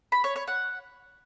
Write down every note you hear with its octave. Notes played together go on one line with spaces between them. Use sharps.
B5
C#5
C#5
F#5